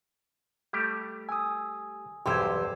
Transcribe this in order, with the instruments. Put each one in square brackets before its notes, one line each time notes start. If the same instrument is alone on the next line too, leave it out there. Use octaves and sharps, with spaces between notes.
[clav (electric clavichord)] G3 A3 G4 [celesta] G6
[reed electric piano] G#5 D#6 [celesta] E6
[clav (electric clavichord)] B1 E2 G2 [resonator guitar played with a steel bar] G4 C5 [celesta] C6 E6 G#6